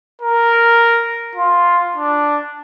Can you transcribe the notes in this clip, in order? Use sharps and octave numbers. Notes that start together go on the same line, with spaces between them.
A#4
F4
D4